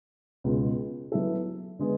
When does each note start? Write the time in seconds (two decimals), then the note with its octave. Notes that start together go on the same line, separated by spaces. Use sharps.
0.44 C#2 B2 G#3
1.12 F#3 B3 E4 A4 E5
1.79 D3 G#3 B3